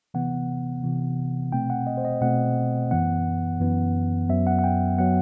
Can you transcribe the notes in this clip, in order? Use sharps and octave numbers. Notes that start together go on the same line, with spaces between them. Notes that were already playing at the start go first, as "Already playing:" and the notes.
C3 E3 B3 F#5
C3 E3 B3
B2 A3 C4 G5
F#5
D#5
C5
D#5
B2 A3 C4 F#5
F#2 E3 B3 F#5
F#2 E3 B3
F#2 F#3 B3 E5
F#5
F#5
G5
F#3 B3 F#5